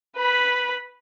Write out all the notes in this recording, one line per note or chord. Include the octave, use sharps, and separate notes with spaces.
B4 B5